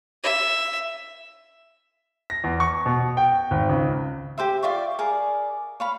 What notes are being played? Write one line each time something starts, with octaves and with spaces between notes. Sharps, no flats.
E5
A#6
E2
C#6
B2
G5
G#1
C#2
G4 C5 E5
F4 D5 E5 C#6
G#4 A#4 D5
C#5 F5 B5